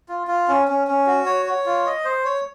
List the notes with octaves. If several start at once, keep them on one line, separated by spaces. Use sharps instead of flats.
F4
F4
C#4
C#4
C#4
F#4
C#5
C#5
F4
D#5
C5
C#5